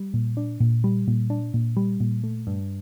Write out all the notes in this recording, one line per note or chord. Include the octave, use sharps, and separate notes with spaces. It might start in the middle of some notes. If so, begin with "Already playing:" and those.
Already playing: G3
A#2
D4
A#2
G3
A#2
D4
A#2
G3
A#2
A3
G2